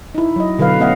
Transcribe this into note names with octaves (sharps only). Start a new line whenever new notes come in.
D#4 E4
F#3 D#5
B2 D3 F#3 B4 F5
A3 B3 C#4 D#5 F5 F#5